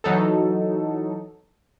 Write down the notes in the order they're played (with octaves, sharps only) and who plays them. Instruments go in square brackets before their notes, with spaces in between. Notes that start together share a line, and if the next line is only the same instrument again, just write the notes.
[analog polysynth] E3 F#3 D#4 A4